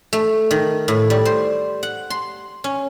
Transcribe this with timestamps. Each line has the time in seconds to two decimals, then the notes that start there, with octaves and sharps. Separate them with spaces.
0.13 A3
0.51 D#3
0.88 A2
1.10 G3
1.25 C5
1.83 F#5
2.10 C6
2.64 C#4